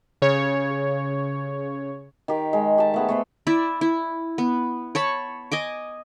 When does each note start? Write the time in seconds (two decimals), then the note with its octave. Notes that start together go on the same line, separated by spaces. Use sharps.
0.22 C#3 C#5
2.28 D#3 G4
2.53 G#3
2.78 G4 A5
2.94 A3 B3 G#4
3.09 A3 B3 C5
3.47 E4 D5 E5
3.81 E4
4.38 B3
4.95 C#5 A5 B5
5.52 D#5 G#5 D6